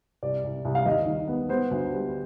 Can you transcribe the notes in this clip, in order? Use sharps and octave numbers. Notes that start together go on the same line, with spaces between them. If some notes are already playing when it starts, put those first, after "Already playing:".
C2 D5
C2
C2
F5
D#2 D#5
D#3
B3
B3 C5
D2
G3